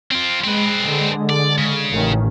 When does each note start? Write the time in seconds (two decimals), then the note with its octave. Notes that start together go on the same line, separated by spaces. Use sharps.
0.11 C4 F4
0.44 G#3 C4 B4
0.80 D3 G#3
1.29 D5
1.58 C#3
1.92 A1 D#3 C#4